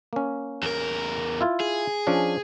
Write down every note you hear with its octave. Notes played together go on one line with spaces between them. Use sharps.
A#3 C#4
E2 A#4
E4 F4
G#4
F3 C#4 D4